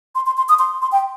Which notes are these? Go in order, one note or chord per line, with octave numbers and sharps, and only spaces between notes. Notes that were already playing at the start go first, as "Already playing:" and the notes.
C6
C6
C6
D#6
C6
C6
G5